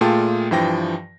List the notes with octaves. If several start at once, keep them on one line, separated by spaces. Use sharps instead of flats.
A#2 A3 F4 G#4 G5 A5
G2 E3 F3 G5 A#6